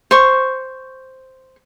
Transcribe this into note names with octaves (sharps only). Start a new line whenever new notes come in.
C5 C#6